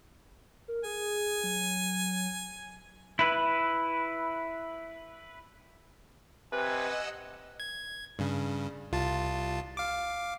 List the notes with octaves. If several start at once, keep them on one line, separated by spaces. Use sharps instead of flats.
A#4
G#4 G#5
F#3
E4 B4
C3 B4 D#5 F#5 G#5 E6
G#6
G2 C#3
C2 F4 A5
F5 D6